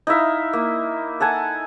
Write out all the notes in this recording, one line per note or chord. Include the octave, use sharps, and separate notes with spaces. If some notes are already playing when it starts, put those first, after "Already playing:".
D#4 E4 E5 F5
A#3
A4 F#5 G#5 A5